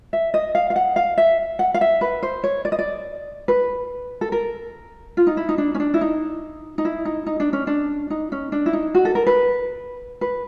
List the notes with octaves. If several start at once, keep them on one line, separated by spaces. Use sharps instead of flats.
E5
D#5
F5
F5
F#5
F5
E5
F#5
F5
E5
B4
C5
C#5
D5
D#5
D5
B4
A4
A#4
F4
D#4
E4
D#4
D4
C#4
D4
E4
D#4
D#4
E4
D#4
D#4
D4
C#4
D4
D#4
C#4
D4
E4
D#4
F#4
A4
A#4
B4
B4